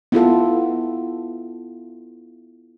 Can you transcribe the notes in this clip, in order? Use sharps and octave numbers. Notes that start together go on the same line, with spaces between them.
B3 E4 F4 A4